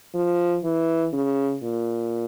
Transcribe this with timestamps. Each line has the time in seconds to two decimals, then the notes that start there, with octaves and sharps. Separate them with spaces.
0.15 F3
0.64 E3
1.14 C#3
1.63 A#2